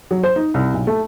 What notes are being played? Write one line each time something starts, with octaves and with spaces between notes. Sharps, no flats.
F#3
C5
D#4
C2
B1
A3